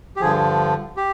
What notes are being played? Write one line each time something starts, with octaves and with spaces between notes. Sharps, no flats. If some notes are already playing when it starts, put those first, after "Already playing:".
G4
G2 D3 F3 G#4
G4